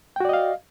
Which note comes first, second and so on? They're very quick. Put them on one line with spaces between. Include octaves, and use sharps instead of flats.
G5 F#4 D5 D#5 F5